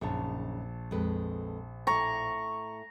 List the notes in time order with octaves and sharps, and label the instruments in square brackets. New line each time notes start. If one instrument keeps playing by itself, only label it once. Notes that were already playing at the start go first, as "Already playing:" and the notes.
[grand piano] A#1 A5 [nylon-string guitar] F#2 C#3 D#4
[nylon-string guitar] F2 G#3 B4
[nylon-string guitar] A2 E4 D5 [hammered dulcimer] A#5 C#6